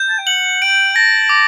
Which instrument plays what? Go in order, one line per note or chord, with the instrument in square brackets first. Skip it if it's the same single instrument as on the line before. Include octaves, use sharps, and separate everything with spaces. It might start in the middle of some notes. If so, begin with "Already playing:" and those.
Already playing: [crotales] G6
[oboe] A5
G5
[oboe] F#5 [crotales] F#7
[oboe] G5 [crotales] D7
[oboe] A5 [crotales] A#6
[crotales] D6